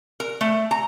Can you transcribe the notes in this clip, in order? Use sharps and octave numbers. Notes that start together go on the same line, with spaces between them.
A#4
A3
A#5